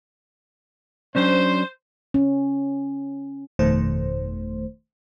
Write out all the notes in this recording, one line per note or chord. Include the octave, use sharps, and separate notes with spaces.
F#3 C#4 D4 C5
C#4
G1 F2 B2 D#3 A3 C5